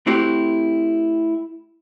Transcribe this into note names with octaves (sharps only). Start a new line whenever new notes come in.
A3 C4 E4 F#4 G4